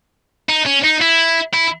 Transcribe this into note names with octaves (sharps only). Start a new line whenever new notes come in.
D#4
C#4
D#4
E4
E4